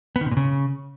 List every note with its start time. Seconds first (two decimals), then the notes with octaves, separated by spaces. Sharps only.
0.16 B3
0.21 D#3
0.26 C3
0.31 A#2
0.37 C#3